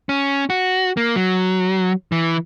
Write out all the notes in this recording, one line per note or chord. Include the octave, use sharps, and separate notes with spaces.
C#4
F#4
A#3
F#3
E3